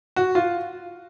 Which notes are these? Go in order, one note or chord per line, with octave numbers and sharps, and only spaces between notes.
F#4
F4